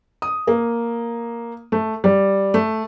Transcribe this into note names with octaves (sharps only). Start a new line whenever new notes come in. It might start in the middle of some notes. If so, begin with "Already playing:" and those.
D#6
A#3
A3
G3
A3